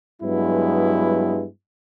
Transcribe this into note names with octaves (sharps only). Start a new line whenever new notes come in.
G2 F#3 G#3 B3 E4